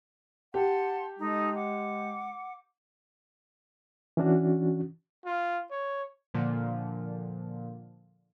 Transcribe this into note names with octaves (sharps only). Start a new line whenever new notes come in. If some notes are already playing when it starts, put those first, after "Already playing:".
G4 F#5 A5 C6
G#3 D#4 A4
F#5 D6
E3 C#4 D4 F#4
F4
C#5
A#2 D3 F3